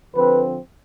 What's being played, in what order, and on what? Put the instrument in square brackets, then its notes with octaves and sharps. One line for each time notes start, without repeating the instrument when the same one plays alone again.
[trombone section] D3 F3 C4 B4